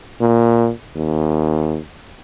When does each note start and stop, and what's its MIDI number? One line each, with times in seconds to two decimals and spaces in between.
0.20 0.70 46
0.96 1.79 39